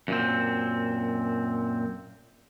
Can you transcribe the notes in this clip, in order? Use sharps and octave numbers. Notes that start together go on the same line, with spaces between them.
F#2 A#2 C4